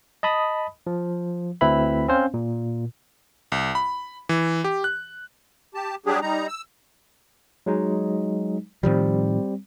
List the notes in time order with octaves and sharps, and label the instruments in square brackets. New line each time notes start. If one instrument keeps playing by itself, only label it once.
[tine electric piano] D#5 A5 B5 D#6
F3
D2 C4 E4 B4 E5 B5
C4 C#4 C5 F5
A#2
[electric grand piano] C2
B5
E3
G4
F#6
[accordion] G4 A5
F#3 G3 D4 G4 G#4
G3 D#4 A#5
E6
[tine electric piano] F#3 G#3 D#4
[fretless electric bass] A2 D#3 F3 [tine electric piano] G3 C4